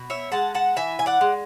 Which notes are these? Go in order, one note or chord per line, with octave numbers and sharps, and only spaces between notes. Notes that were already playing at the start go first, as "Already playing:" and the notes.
Already playing: B2
C#5 E5
G#3 F#5 A5
F#5 A5
E3 E5 G#5
G#5
D5 F#5
G#3